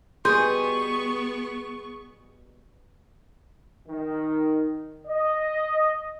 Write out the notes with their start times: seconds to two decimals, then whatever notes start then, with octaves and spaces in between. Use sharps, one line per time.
0.25 B2 G3 B3 G#4 C6 C#6 G6
3.88 D#3
5.07 D#5